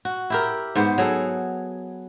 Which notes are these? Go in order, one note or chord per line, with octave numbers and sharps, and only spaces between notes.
F#4
E4 G4 A#4
G#2 B3 C5
F#3 G#4 A4